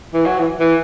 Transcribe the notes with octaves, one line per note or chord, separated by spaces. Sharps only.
E3
F#3
E3
E3